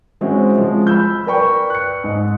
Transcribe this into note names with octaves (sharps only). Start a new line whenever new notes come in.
E3 G#3 C4 C#4 E4 F#4
F3 G#3
B5 E6 G6
A#4 B4 D5 G5 B5 C#6
F#6 C#7
G#2 D#5